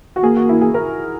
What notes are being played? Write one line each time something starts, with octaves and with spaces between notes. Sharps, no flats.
F#4
A#3 G#4
F#4
E4
G#4
A#4